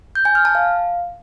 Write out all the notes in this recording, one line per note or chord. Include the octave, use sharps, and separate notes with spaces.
G6
G#5
F6
A5
F5